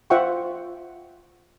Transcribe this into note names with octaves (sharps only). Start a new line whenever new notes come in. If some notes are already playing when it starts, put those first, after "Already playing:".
F4 C5 E5 F#5 G5 C#6